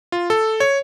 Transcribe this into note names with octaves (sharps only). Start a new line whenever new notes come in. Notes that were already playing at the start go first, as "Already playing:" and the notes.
F4
A4
C#5